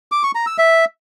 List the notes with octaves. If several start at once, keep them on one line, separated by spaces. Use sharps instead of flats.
D6
C#6
A#5
E6
E5